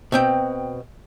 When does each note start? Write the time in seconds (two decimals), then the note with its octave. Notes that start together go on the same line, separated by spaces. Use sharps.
0.12 B2 C4 G5